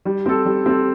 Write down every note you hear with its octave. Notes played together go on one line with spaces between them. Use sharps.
G3
C4 A4
G3
C4 A4